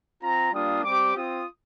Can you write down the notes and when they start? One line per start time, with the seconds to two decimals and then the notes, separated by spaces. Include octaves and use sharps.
0.22 C4 F4 A#5
0.53 G3 A#3 D4 F4 D#6
0.84 G3 C4 G4 D6
1.15 C4 F4 D#6